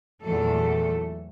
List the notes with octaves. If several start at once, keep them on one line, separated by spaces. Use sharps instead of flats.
E2 A#2 E3 F#3 A3 A4